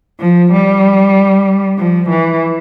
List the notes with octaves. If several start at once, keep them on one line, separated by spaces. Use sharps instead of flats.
F3
G3
F3
E3